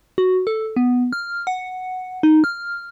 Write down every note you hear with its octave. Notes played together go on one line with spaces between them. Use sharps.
F#4
A4
B3
F6
F#5
D#4
F6